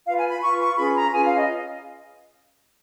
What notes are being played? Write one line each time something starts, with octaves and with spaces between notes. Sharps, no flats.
F4 B4 F5
G#5
B5
F4 B4 C#6
C#6
C#4 F4 G#4 B4 B5
A#5
C#4 F4 G#4 B4 G#5
F5
D#5